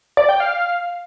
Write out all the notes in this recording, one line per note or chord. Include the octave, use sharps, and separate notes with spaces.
D5
G5
F5